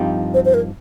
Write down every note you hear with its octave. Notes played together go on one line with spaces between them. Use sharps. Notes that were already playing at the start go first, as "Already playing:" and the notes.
Already playing: G2 F3 C4 D#4 G4
C5
C5
A#4